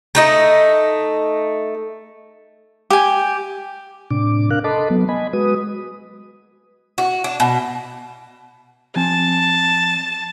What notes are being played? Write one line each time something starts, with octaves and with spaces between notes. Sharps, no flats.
A3 D#4 D#5
G4 G#5
A2 C3 D4 D6
D4 A#4 F5 F#6
A4 D#5 A5 B5 C6 D6
F#3 B3
D#5 G#5 B5
G#3 F#4 B4 D#6
F#4
D4
B2
F3 C4 G#5 A5